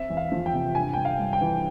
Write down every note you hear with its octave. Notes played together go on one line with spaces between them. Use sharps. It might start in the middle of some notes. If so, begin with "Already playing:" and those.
Already playing: C4 E5
E2
F5
F3
G5
C3
G2 G#5
G2 G5
F5
G3
G5
E3